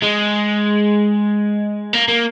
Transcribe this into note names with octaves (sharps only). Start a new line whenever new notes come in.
G#3
A#3
A#3